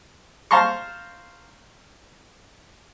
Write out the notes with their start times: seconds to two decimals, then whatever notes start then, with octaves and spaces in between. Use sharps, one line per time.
0.51 C5 F5 A5 A#5 C6 C#6